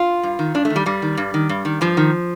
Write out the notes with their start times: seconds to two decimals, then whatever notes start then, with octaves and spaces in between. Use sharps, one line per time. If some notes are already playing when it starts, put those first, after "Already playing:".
Already playing: F4
0.23 G2
0.39 D#3
0.54 G2 D4
0.65 A3
0.70 D#3
0.76 G3
0.86 G2 G3
1.02 D#3
1.17 G2
1.34 D#3
1.49 G2
1.65 D#3
1.81 G2 F3
1.97 D#3